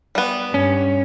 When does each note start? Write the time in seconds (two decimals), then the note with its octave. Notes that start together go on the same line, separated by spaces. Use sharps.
0.15 G3 B3
0.54 G2 C#4